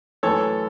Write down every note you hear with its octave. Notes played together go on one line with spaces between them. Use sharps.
F#2 E3 A3 A4 C#5